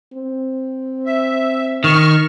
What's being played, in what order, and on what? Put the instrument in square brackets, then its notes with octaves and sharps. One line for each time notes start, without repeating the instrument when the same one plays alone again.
[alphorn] C4
[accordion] E5
[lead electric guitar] D#3 [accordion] C#6 F6